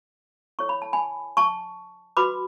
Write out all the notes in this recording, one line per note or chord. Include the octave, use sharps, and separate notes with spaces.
E4 A4 C#5 C#6
B5
A5
G#5 B5
A5 C#6
F#4 B4 B5 D6